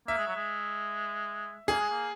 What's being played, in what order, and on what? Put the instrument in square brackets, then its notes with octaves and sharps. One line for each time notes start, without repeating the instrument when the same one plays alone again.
[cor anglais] A#3 [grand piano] E5
[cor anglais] G#3
F#3
G#3
[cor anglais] A#3 [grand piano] G#4
[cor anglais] G#3
A#3